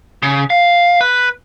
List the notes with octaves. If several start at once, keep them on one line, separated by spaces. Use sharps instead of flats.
C#3
F5
B4